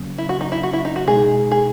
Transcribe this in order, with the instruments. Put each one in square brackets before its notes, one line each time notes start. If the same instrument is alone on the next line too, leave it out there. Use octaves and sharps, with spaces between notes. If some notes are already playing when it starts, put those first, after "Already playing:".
Already playing: [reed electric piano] E2 C#3 F#3 A#3 C#4
[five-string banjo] E4
F#4
D#4
E4
F#4
E4
D#4
F#4
[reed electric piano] B2 G#3 D#4 [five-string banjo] G#4
[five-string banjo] G#4